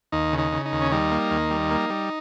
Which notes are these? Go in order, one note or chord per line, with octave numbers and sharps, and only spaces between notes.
D#2 D#4
C#3
D#4
C#3
D#4
D#2
C#4
G3 D#4
A#3
D#2
G3
A#3
G3